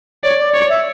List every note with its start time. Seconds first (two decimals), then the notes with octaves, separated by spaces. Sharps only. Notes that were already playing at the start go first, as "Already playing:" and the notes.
0.23 C#5 D5
0.38 D5
0.54 C#5 D5
0.69 E5